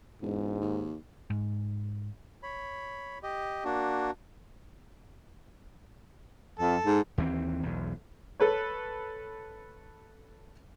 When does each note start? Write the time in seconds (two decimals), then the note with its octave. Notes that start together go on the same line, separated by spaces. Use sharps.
0.22 E1 G#2
0.61 D#2
1.30 G#2
2.43 C#5 B5
3.23 G4 D#5
3.65 A#3 D4 F#4
6.59 F2 A4
6.86 G#2
7.18 D#2 E3 F3 C4
7.63 B1 E2
8.40 A4 B4 C#5